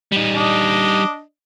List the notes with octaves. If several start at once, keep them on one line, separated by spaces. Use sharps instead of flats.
G3 D#4
D4 D#5